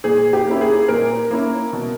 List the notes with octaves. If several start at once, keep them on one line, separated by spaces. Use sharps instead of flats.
A#2 G#4
G4
A#3 C#4 E4
G#4
A#2 A#4
A#3 C#4 E4
B2